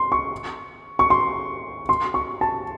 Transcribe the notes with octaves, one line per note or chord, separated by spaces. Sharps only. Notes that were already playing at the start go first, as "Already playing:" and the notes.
Already playing: C6
C#6
C#6
C6
C6
C#6
A5